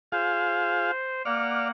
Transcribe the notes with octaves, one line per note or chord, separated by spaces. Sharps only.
F4 G#4 C5 F5
A#3 D5 F#5 F6